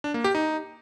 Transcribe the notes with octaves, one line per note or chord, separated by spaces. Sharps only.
D4
A#3
G4
D#4